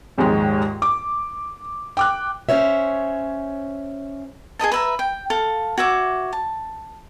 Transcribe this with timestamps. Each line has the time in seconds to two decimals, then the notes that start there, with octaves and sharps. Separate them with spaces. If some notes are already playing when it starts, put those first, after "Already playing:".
0.18 A#1 D#2 G#2 G#3
0.82 D6
1.97 G5 D6 F#6
2.49 C#4 C5 C#5 E5
4.59 G#4 A#4 D#5 A5
4.72 B4 E5 A#5
4.99 G5
5.30 A4 F5
5.78 F#4 C#5 E5 D6
6.33 A5